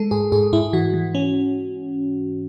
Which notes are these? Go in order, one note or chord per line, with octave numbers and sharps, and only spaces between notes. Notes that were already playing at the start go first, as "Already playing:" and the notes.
Already playing: G#3 A4
G#2 G#4
G#2 G#4
G#2 E4
E3 F#4
E3
C#4